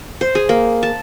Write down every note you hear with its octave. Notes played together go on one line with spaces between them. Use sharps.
C5
G#4
A#3
A5